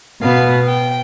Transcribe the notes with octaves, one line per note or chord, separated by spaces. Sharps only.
B2 B3 F5
G5